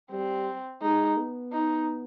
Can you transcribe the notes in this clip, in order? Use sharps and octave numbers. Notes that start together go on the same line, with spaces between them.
G3 C4
G#3 D#4
B3
D#4